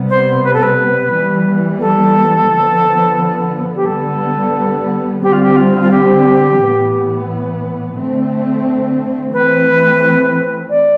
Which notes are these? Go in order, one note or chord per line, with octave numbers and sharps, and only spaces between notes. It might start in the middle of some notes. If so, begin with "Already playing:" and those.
Already playing: C3 G3 B3
C5
B4
A4
B4
E3 G3 B3
A4
D3 F3 B3
G4
D3 G3 B3 A4
D3 G3 C4 G4
F4
G4
F4
F4
G4
A2 E3 B3
D3 A3 C4
E3 A3 C4 B4
D5